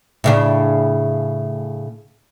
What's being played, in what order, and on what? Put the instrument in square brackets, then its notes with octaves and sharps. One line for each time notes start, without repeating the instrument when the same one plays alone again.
[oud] A2 C#3 D4